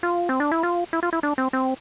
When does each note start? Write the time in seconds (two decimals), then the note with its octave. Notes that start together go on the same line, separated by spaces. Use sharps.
0.03 F4
0.29 C4
0.40 D4
0.52 E4
0.63 F4
0.93 E4
1.03 F4
1.13 E4
1.23 D4
1.38 C4
1.53 C4